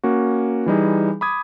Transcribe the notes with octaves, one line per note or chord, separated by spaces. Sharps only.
A#3 C#4 F#4
E3 G3 D#4 G#4
B5 D6 D#6 G#6